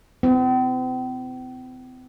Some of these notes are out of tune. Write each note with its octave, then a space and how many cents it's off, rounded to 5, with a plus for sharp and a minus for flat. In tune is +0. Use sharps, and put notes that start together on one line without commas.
C4 -45 E4 +35